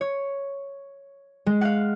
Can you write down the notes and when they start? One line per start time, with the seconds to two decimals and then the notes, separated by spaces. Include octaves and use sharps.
0.01 C#5
1.46 G#3
1.61 F5 F#5